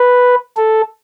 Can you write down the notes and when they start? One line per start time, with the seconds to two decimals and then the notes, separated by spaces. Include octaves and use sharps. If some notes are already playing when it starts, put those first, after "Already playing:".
Already playing: B4
0.57 A4